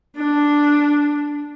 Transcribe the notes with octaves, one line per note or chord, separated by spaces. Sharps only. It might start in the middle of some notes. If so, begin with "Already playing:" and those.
D4